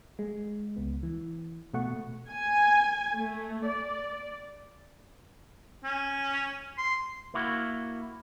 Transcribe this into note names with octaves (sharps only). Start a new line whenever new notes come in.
G#3
C#2 B3
E3
B2 A3 F#5 C#6
G#5
A3
D5
C#4
C6
A#3 E4 F#4